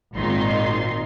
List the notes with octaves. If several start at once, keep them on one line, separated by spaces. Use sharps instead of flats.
G#1 A#2 D#3 D#4 C6